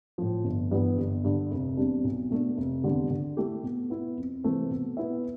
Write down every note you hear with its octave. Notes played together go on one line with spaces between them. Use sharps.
A2 F3
G1
G2 E3 G3 B3
G1
G2 D3
F1
E2 C3 G3 D4
B1
B2 A3 D4
F1
E2 D3 G3
D3
A3 E4 G4
B2
B3 E4
F2
C3 E3 A3 C4
B2
B3 E4 B4 E5